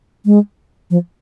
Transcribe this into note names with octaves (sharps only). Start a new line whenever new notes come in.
G#3
F3